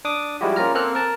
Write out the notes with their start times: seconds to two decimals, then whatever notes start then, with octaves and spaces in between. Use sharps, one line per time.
0.05 D4 D6 D#6
0.41 F3 G3 G#3 E4 F#4 G4
0.56 A#3 C#4 F4 A#5 F6
0.75 A#3 C4 A4 F6 F#6
0.95 A#4 A5